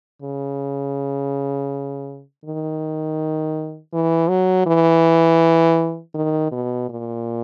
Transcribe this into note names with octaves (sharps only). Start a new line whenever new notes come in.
C#3
D#3
E3
F#3
E3
D#3
B2
A#2